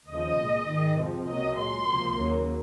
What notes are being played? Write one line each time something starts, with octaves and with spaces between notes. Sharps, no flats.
D#2 C#3 F3 D#5
C2 A#2 G#3
G#2 D#3 G#3
F2 C3 F3 G#3
C#2 C3 F#3 A#3 D#5
A#2 G#3 C6
C#2 C3 F3 A#3
D#2 C#3 F#3 A#3